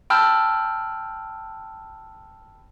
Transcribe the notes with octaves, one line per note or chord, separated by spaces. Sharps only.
G5 A5 B5 E6 F6 G6